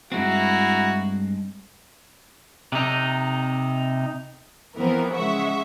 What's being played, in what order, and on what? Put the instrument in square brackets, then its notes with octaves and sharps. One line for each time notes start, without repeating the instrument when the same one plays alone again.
[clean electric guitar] G2 G#3 C4 [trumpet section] E4 F#4 A#5
[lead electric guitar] C3 D#4
[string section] E3 F3 B3 C4 A#4
C#3 G#3 E5 F#5 C#6